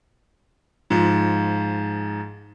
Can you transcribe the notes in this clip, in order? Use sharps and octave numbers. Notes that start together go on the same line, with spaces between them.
G#2 F3